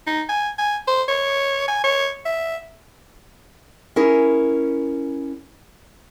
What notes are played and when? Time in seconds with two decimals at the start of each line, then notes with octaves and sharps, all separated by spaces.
0.07 D#4
0.29 G#5
0.58 G#5
0.87 C5
1.08 C#5
1.68 G#5
1.84 C#5
2.25 E5
3.96 C#4 E4 G#4 A#4